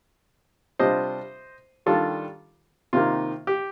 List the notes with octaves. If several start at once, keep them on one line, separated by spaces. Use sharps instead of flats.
C3 G3 D4 F4 C5 D#5
D#3 G3 D4 F4 A4
C3 D#3 A#3 D#4 F4
G4